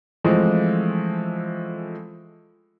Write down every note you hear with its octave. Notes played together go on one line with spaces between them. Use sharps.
E3 F3 G#3 A3 C4